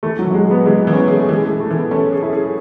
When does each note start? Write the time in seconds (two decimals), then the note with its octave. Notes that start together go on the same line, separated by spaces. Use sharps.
0.03 E3 A3
0.19 F#3
0.24 E3
0.31 F#3
0.34 G#3
0.45 G#4
0.51 B3
0.66 E3 G#3
0.82 B3
0.87 E3
0.93 C#4
0.97 B3
1.08 G#4
1.14 A3
1.29 E3 G#3
1.44 A3
1.49 E3
1.60 A3
1.71 E3
1.76 B3
1.91 A3 C#4
2.12 G#4
2.22 E4
2.33 G#4